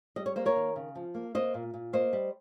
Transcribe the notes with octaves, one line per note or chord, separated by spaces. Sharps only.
G3 D#5
C#5
A#3 C5
A#4 C#5
D#3
C#3
F3
A#3
A#3 C5 D#5
A#2
A#2
A#3 C5 D#5
G3